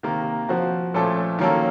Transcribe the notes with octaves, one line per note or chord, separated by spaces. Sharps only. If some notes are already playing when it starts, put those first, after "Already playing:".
C3 D#3 A#3
F3 C4 F#4
A#2 F3 A3 C#4 A4
D#3 F#3 A#3 C#4 A4